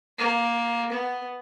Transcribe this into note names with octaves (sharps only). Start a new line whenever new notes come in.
A#3
B3